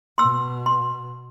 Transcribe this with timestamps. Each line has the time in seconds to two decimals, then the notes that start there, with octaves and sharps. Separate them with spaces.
0.18 B2 C6 E6
0.66 C6